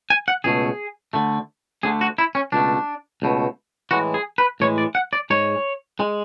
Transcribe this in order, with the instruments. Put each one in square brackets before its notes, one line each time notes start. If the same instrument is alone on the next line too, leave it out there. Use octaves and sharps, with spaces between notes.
[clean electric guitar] G#5
F#5
C#2 B2 A3 G#4
D2 D3 A3
D2 D3 A3 G#4
F#4
E4
C#4
C#2 B2 A3 D4
C#2 B2 A3
A2 E3 G#3 F#4
G#4
B4
A2 E3 G#3 C#5
D5
F#5
D5
G#2 G#3 C#5
G#3